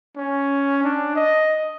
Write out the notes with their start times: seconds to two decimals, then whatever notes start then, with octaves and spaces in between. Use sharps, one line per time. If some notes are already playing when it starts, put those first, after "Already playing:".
0.17 C#4
0.83 D4
1.15 D#5